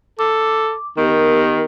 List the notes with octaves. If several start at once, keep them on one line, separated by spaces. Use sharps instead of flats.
A4 D6
D#3 B3 G4 A#4